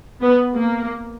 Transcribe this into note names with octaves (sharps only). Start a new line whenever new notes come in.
B3
A#3